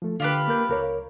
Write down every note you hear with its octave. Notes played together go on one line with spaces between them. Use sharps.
F3 A3
D3 F4 G4 B4
A#3 A#4 G6
C#2 A#4 C#5